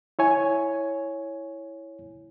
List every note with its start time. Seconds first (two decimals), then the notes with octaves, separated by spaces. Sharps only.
0.19 E4 C#5 G#5